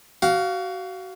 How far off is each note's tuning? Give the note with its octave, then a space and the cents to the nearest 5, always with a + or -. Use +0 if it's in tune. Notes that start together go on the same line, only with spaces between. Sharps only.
F#4 +25 F5 +0